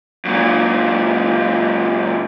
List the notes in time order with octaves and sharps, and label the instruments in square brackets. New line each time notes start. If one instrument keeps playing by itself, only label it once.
[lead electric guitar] F#2 A#2